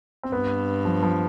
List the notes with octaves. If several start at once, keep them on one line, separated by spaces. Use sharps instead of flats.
C4
G2 B3
F3
F3